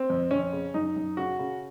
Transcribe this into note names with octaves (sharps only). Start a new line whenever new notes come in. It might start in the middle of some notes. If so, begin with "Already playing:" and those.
Already playing: C4
F2
F2 C#4
C#3
F#2 D#4
F#2
C#3 F#4
C#3